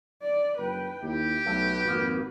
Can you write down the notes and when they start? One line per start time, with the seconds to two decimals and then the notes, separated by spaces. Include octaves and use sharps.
0.22 D5
0.58 F#1 B4 G5
1.02 D#2 E4 G4
1.46 B1 A3 F#4 B4
1.85 G#1 F2 A#3